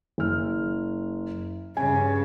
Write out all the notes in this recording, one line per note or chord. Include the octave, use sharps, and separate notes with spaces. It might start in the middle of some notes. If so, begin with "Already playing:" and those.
F#1 F6
G2 C#3 G#5